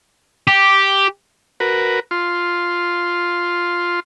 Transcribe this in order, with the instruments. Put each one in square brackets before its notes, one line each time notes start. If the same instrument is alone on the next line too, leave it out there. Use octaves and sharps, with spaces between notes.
[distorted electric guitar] G4
[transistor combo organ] F#4 A#4 B4
F4 C6